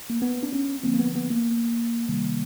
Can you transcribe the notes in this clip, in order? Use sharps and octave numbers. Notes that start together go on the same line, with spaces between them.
A#3
B3
D4
B3 C#4
D3 F3 A3 A#3 C4
A#3
B3
B3
A#3
C3 D#3 G3 A#3